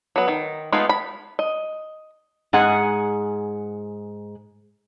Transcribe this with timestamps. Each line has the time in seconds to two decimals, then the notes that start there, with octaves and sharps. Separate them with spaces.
0.16 F#3 B3
0.28 D#3
0.72 G#3 A3 B3 D#4 F4
0.89 B5
1.39 D#5
2.53 G#2 G#4 F#5